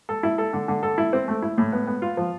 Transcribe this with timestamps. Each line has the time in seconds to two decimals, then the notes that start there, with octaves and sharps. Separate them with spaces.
0.09 A4
0.23 E4
0.38 A4
0.53 D3
0.68 D3
0.83 A4
0.98 E4
1.13 C4
1.28 A3
1.42 E4
1.58 A2
1.72 B3
1.87 B3
2.02 F4
2.17 F3